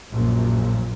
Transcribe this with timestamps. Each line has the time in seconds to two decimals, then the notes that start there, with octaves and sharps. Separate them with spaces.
0.11 A#1 F#2 A#2